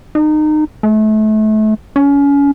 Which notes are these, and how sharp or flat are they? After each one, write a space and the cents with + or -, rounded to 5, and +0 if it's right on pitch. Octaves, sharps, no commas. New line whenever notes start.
D#4 -25
A3 -30
C#4 +30